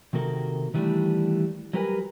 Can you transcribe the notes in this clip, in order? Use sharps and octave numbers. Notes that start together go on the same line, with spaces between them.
C3 D#3 A#3 F#4 A4 A#4
D#3 E3 G3 A3 D4
F#3 G3 G4 A#4 B4 G#5